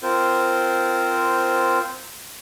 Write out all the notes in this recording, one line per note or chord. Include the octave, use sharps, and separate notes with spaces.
C4 F4 A#4 C5